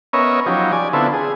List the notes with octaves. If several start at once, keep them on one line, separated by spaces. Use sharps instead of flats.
B3 C#4 A#4 C#5 D#5 E5
F3 F#3 C#4 D#4 G4
D5 G#5
D3 B3 C4 E4 F4 A4
G#4